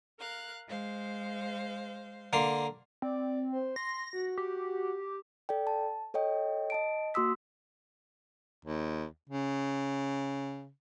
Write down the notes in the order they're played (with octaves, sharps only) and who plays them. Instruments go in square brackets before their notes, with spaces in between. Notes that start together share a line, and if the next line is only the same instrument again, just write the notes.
[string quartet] A#4 F5 F#6
G#3 C5 F5
[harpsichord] D3 A#3 C6
[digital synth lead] C4 [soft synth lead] D5
[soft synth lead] C5
[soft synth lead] C6 [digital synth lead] A#6
[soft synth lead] F#4
[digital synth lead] G4
[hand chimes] A4 D5 G5
A5
A4 C#5 D#5 G5
D#5 A5 D7
A#3 F#4 C6 D#6 E6 B6
[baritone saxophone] D#2
C#3